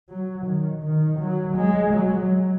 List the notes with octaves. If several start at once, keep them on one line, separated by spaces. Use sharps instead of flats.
F#3
D#3
D#3
F#3
G#3
F#3